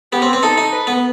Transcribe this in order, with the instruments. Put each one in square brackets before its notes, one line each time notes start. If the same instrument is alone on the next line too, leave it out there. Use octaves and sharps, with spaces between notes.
[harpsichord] B3 [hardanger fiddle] G4
[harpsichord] C4
C4
[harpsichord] D#4 [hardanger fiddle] A4
[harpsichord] D#4
[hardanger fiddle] B4
[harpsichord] B3